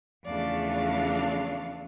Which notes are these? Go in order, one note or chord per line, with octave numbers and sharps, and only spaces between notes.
E2 C#3 F3 A3 D4 D5 F5
D5 F5